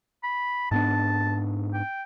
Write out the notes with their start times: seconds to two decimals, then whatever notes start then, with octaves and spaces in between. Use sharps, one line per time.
0.24 B5
0.71 G#2 B3 D4 A5
1.73 G5